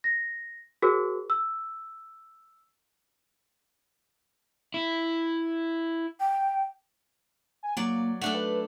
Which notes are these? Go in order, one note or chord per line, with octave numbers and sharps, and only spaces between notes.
A#6
F#4 G#4 A#4 C5
E6
E4
G5
G#5
F#3 A#3 D5
A3 D4 A4 F#5
B4